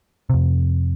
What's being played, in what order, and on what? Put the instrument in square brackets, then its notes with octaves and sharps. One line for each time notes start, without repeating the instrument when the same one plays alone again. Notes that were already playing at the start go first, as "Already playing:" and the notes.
[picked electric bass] F2 C3